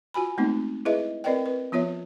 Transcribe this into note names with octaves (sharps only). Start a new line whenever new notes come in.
F4 F#4 G#5 B5
G#3 A3 B3 C4 D#4
E4 G#4 B4 D#5 E5
C4 A#4 B4 D5 D#5 G5
B4
F3 B3 F4 C#5 E5